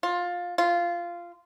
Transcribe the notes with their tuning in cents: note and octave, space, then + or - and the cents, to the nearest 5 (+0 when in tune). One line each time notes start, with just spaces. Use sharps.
F4 +15
F4 -10